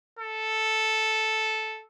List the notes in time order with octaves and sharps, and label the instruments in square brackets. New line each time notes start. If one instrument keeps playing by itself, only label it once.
[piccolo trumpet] A4